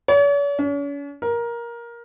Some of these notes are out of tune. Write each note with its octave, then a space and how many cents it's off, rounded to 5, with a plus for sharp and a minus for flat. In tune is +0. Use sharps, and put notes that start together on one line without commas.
C#5 +45
C#4 +40
A#4 +15